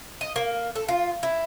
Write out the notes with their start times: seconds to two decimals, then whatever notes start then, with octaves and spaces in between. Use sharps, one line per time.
0.21 D#5
0.36 A#3
0.75 A4
0.88 F4
1.23 E4